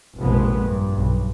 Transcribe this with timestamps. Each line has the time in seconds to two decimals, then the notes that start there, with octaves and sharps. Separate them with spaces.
0.18 F1 A#1 B2 G#3 B3
0.60 G2
0.95 B1